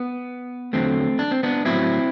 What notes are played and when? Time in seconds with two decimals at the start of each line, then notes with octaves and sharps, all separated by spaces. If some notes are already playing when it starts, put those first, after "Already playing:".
Already playing: B3
0.73 E2 D3 F#3 A3 C4
1.19 D4
1.31 C4
1.43 B3 D4
1.65 A2 F#3 C4 E4